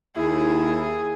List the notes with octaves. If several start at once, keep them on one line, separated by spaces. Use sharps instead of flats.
D#2 E4 G#4